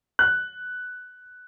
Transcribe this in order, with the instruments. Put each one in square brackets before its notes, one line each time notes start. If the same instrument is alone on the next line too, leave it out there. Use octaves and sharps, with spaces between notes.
[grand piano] F#6